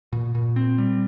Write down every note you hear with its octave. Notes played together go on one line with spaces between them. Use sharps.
A#2
A#2
C4
G3